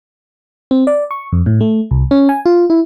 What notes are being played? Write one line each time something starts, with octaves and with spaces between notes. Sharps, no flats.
C4
D5
C#6
F2
A2
A3
C2
C#4
G#5
F4
E4